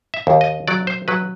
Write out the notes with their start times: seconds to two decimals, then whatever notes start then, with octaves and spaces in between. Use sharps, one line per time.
0.14 E5
0.27 D#2
0.41 D#5
0.68 F#3 D5
0.87 C5
1.08 F#3 B4